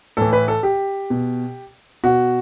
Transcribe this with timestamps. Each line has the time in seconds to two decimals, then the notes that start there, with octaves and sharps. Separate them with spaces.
0.17 A2 E3 A4
0.33 B4
0.48 A4
0.63 G4
1.10 B2
2.04 B2 F#4